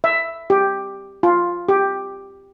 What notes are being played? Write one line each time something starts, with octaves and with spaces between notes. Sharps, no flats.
E5
G4
F4
G4